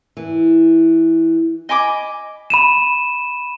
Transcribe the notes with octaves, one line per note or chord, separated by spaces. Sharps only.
E3
D#5 G#5 B5 D6
B5 D#7 E7